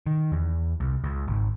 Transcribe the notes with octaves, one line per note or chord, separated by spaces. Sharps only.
D#3
E2
C2
C#2
G#1